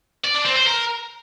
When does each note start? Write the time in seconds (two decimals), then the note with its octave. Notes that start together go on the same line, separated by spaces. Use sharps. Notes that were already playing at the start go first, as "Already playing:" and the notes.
0.24 D5
0.35 D4
0.46 C4
0.56 C5
0.67 A#4